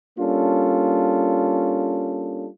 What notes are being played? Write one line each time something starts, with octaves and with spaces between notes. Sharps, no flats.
G3 A#3 C#4 D4 F4 A4